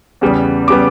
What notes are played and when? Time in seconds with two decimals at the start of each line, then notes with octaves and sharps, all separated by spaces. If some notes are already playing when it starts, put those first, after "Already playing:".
0.21 E2 C#3 G3 B3
0.68 C#3 G3 B3 D6